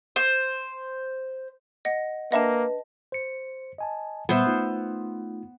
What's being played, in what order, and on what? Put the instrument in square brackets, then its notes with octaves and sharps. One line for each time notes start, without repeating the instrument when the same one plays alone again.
[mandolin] C5
[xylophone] D#5 F#5
[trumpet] A#3 [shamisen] D4 E5 F#5 [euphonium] B4 [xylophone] D#5 A5
[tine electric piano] C5 C#7
D#5 G#5 A5
[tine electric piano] A#2 G3 [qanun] B3 C5 E5
[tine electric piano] A3 D#4 F4